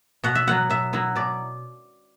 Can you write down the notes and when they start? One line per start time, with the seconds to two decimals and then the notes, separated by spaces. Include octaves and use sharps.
0.24 B2 F#5
0.35 E5
0.47 F#3 B3 E4 F#5
0.70 B2 E5
0.93 F#3 B3 E4
1.15 B2 D5